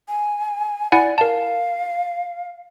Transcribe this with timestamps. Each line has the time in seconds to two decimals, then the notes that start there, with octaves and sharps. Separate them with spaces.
0.08 G#5
0.92 E4 D5 F#5 G#5
1.18 A#4 F5 A5